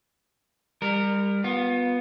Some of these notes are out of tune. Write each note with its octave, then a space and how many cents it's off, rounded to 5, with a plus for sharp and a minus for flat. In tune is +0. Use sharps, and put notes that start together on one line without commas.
G3 +30 A#4 -10
B3 +0 F4 +35